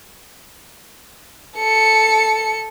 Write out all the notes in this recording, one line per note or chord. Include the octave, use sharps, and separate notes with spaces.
A4 C#7